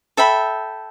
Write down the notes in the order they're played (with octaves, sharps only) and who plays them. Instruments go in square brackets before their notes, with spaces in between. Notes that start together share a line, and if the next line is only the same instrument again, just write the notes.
[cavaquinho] A4 E5 G5 B5